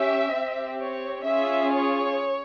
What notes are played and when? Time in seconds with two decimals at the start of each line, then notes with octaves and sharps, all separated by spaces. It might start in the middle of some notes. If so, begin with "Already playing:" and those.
Already playing: C#4 G4 E5
0.34 C4 G4
0.81 C#5
1.25 C#4 F4 G#4 E5
1.72 C#5